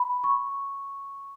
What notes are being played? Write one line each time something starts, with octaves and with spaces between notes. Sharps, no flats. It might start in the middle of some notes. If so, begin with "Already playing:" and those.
Already playing: B5
C#6